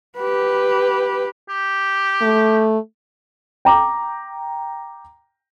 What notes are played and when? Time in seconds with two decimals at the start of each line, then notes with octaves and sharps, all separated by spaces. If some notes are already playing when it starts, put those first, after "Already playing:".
0.17 G4 B4
1.49 G4
2.22 A3
3.65 G5 A#5 D6